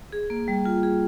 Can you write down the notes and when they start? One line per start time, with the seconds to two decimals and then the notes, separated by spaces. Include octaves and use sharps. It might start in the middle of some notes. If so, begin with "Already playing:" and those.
0.12 G#4
0.30 A#3
0.48 G3
0.66 F4
0.83 G#4